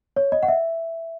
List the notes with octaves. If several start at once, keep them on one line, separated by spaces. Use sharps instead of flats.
C#5
D#5
F#5
E5